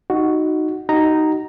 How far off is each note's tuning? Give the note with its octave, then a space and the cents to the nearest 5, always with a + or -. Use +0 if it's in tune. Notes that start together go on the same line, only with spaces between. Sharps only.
D#4 -5 F#4 +0
D#4 +0 F#4 +30 A#5 +0